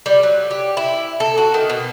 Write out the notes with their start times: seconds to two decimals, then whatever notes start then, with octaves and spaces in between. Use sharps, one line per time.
0.06 G3
0.23 F#3
0.51 G4
0.77 E4
1.20 A4
1.38 F#4
1.54 D#3
1.70 B2